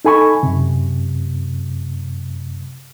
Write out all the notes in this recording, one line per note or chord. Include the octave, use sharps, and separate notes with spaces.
D#4 A4 G#5 B5 C#6
F#2 C3